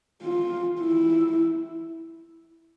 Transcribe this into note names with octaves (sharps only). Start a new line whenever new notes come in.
F4
E4